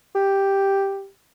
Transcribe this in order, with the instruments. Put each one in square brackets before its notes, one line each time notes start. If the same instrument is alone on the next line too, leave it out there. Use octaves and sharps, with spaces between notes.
[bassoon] G4